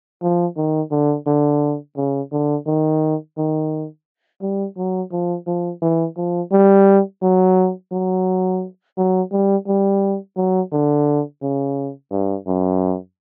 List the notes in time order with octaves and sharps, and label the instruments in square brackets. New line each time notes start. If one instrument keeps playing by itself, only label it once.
[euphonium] F3
D#3
D3
D3
C#3
D3
D#3
D#3
G3
F#3
F3
F3
E3
F3
G3
F#3
F#3
F#3
G3
G3
F#3
D3
C#3
G2
F#2